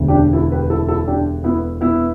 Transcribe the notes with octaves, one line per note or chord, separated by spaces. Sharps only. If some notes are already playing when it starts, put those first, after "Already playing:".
Already playing: E1 D2 D3
D4 G4
E4 A4
G4 B4
E4 A4
E4 A4
D4 G4
B3 E4
B3 E4